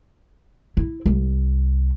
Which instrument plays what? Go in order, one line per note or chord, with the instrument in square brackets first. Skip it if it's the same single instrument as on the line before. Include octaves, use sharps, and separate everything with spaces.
[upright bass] E4
C2